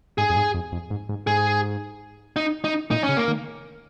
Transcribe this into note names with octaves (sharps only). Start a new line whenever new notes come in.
G#2 G#4
F2
G#2
F2
F2
G#2
G#2
G#2 G#4
D#4
D#4
A#2 D#4
C#4
C#3
A#3
D#3